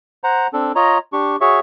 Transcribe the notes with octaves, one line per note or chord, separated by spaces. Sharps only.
C5 F#5 A#5
C4 D4 A4
F4 C#5 D#5 A#5
D4 G4 C#6
F#4 G#4 C#5 E5 C#6